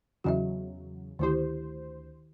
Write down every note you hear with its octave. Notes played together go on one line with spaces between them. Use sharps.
E2 C#3 F#3 F#4 D#5 E5
D2 D#3 E4 G4 C5